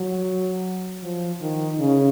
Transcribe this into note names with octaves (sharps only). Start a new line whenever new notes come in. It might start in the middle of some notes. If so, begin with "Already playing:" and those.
Already playing: F#3
F3
D#3
C#3